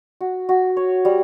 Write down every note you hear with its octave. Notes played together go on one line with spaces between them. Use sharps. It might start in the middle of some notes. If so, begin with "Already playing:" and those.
F#4
F#4
C#5
G3